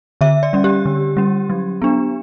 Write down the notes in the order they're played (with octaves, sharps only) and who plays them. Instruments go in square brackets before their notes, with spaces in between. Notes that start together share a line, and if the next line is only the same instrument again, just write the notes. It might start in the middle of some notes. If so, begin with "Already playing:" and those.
[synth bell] D3 E5
D5
G3 C#4
G4
D3
G3 C#4
F#3
B3 D4